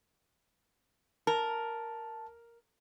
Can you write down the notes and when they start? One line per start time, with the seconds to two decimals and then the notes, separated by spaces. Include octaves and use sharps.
1.27 A#4 A5